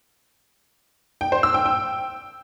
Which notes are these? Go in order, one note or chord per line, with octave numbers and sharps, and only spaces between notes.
G5
C5
E6
G5
G5